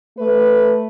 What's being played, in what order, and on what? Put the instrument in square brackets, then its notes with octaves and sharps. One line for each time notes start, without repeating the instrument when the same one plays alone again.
[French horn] A3 [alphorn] B4